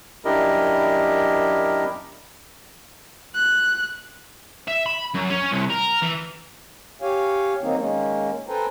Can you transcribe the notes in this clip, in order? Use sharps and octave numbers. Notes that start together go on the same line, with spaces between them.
F#2 D4 E4 G4 A#4 D#5
F#6
E5
B5
F#2
C#4
C2
A#4
E3
G4 C#5 F5 G#5
D#3 F#3 A#3 C4 D#4
D#3 G#3 A#3 C#4
A4 B4 C5 G5 G#5 A#5